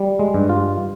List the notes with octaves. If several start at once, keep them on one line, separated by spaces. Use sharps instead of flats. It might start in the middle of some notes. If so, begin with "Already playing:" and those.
Already playing: G3
G#3
G2
F4